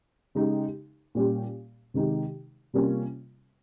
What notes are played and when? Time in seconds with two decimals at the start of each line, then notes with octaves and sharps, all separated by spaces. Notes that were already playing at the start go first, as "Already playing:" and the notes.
0.35 C#3 G#3 D#4 G4
1.15 A#2 G3 C#4 G4
1.94 C3 D#3 G#3 D#4 G4
2.74 C3 G3 A#3 C#4 F4